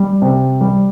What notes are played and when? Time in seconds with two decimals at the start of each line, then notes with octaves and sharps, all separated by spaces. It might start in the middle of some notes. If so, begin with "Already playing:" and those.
Already playing: G3
0.22 C3
0.61 G3